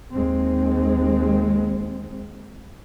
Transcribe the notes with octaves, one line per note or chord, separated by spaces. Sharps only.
D#2 G#3 C4